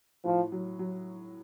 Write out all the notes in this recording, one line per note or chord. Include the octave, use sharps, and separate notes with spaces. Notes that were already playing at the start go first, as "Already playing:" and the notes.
A2 F3
F#3
F#3